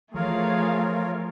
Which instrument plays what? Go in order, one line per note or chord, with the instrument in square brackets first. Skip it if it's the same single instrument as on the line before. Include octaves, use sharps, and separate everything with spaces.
[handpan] E3 F3 [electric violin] A3 [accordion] F4 A#4 C#5 [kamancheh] G#4 F5